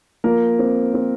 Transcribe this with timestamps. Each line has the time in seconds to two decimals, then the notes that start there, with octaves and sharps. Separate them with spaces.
0.24 F3 A#3 A#4
0.59 C4
0.94 C4